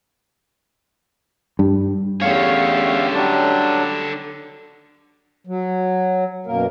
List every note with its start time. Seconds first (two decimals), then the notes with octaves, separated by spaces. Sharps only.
1.59 G2
2.22 E2 D3 A3 C#4 G4 C#5 F5
3.14 F#3 G3 D4
5.47 F#3
6.47 F#2 B2 A#3 A#4